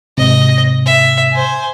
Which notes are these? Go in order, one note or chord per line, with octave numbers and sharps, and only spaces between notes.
G#2 C3 D#5
E5
C5 G#5